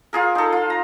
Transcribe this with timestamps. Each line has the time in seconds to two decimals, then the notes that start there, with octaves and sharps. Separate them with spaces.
0.13 F4 G#4 A#4
0.35 D#4 A4
0.52 F4
0.70 A#5